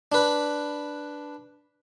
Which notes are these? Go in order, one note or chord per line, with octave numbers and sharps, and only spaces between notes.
D4 B4